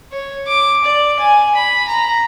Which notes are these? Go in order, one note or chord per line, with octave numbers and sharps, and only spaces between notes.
C#5
D6
D5
G#5
B5
A#5